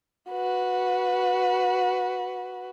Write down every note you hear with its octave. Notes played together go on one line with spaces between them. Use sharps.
F#4 B4